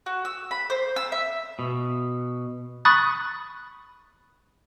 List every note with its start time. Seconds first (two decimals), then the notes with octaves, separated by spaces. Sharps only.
0.06 F#4
0.25 E6
0.51 B5
0.70 C5
0.96 E6
1.12 E5
1.59 B2
2.85 B5 C#6 D#6 F#6 A6